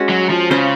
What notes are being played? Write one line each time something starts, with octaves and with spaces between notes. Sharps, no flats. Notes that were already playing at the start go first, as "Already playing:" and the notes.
Already playing: G#3 C#4 F#4
F#3
F3
C#3 C#4 F4 C5